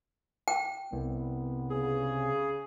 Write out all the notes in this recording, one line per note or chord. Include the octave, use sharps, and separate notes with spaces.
G5
C2 B3
C#3 G#4